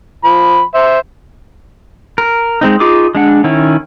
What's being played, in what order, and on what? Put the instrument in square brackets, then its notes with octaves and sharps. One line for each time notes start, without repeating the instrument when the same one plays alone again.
[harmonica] F3 B5
C5 E5
[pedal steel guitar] A#4
G#3 C4 D#4
D#4 F4 G#4 D6
G#3 D4 F#5
D#3 C#4 E4